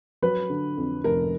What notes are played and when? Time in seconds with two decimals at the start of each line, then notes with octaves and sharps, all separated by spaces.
0.22 F#3 B4
0.50 D3
0.77 F2
1.04 F1 A#4